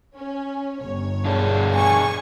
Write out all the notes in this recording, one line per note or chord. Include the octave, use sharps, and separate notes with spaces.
C#4
G1 C#5
B2 D4 G#4
G#5 C#6